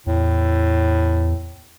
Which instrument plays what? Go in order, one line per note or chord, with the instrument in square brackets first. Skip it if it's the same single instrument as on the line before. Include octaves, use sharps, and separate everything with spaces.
[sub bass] E2 [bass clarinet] A2